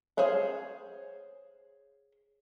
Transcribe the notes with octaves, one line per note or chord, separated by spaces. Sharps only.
G#4 C5 C#5 F5 F#5